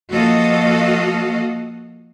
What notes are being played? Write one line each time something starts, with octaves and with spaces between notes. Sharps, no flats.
F3 A#3 F#4 A4 D#5 F5